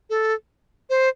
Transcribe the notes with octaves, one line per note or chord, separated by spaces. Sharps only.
A4
C5